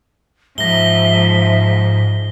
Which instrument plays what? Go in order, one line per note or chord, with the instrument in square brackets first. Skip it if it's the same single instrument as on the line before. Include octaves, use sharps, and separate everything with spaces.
[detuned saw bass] G#2 [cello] F3 [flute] E5 [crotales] A#6 G7